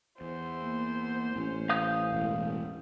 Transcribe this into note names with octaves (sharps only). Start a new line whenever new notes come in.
E2 C5
A#3
A1 C4 C#4
F5 D#6 G6
E1